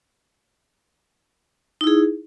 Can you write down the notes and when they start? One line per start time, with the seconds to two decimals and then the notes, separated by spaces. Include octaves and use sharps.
1.81 D#4
1.84 E4
1.87 G#4